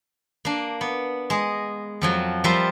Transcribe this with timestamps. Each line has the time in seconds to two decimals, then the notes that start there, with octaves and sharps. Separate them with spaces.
0.45 A#3 D4
0.81 B3
1.30 G#3 D#5
2.01 F2 F3 F#3
2.44 F3 G3 F4 A#4 C5 E5